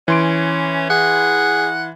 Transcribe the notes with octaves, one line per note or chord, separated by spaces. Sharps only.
E3 C#4 C6 D7
G#4 F#5